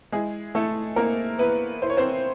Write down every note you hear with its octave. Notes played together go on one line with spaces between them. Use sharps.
G#3 E4 G#4
A3 E4 A4
A#3 C4 A#4
B3 E4 B4
E4 C5
C#5
C4 C5